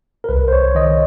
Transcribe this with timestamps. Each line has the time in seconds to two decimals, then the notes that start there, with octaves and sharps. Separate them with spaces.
0.24 A#4
0.29 C2 B4
0.48 C5
0.53 C#5
0.75 D#3 D#5